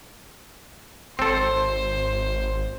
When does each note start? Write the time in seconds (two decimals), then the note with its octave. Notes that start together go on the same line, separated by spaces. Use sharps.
1.19 G#1 C4 A4 C5